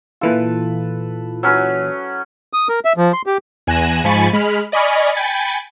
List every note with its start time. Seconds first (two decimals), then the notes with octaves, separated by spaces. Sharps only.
0.21 A#2 E3 F4 A4 B4
1.43 F#3 C#4 B4
2.53 D#6
2.69 A#4
2.85 E5
2.97 F3
3.13 C6
3.26 G4
3.67 E2 G#5 F#6 A#6 E7
4.04 G#2 F3 G#5 B5 C#6 A6
4.33 G#3 B5 F6
4.72 D5 D#5 G#5 B5 C#6 F6
5.13 G5 G#5 B5 A6 C#7